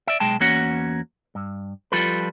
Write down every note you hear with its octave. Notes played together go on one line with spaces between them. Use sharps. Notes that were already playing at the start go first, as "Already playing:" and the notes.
D5 E5
B1 G#3 G5 A5
E2 A#3 C#4 F#4 C#5 F#5
G2
F3 G3 F4 A4 B4